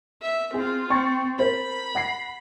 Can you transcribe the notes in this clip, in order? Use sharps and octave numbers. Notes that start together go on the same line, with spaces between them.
E5
C4 F4 G#4
C4 G5 C#6 A6
A#4 C5 B5
F#5 A#6 C7